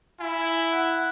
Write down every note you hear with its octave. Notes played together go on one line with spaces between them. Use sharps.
E4 G#5
F#5